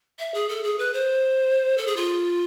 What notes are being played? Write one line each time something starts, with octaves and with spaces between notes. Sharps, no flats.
E5
G#4
A4
G#4
B4
C5
A4
G#4
F4